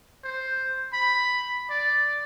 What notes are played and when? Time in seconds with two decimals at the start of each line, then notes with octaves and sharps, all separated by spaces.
0.24 C5
0.93 B5
1.70 D5